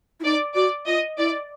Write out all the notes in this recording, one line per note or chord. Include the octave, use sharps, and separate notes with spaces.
E4
D#4 D5
F#4 D5
F4 D#5
E4 D5